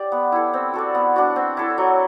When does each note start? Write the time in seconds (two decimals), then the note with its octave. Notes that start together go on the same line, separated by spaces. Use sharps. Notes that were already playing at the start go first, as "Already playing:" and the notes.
Already playing: G4 D5
0.12 B3
0.32 E4 A4
0.54 C4
0.74 F#4 A4 D5
0.95 B3
1.16 D4 F#4
1.36 C4
1.57 E4 A4
1.78 F#3